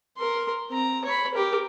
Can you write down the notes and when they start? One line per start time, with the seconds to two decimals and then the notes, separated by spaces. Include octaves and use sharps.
0.18 A#4 C6
0.70 C4 A#5
1.05 C#5 B5
1.34 G4 A#4